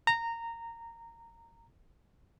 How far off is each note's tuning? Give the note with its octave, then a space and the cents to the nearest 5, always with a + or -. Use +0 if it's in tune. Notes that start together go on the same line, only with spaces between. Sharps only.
A#5 -15